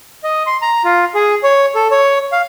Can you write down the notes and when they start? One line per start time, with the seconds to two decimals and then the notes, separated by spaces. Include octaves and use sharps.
0.24 D#5
0.46 C6
0.62 A#5
0.85 F4
1.15 G#4
1.43 C#5
1.75 A4
1.91 C#5
2.32 F5